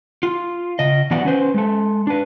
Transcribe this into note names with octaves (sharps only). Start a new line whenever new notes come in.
F4
C#3 D#5
E3 F#3 B3 D5 F#5
C#4 B4 C5
G#3 A4
D4 B4